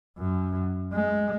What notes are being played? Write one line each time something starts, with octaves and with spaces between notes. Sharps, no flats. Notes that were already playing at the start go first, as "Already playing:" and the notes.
F#2
G#3